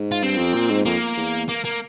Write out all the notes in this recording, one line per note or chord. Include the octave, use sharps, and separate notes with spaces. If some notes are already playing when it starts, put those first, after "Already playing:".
Already playing: G#2
F4
G2 C4
F2
A#2
G#2
F2 A#3
E2
A#3
A#3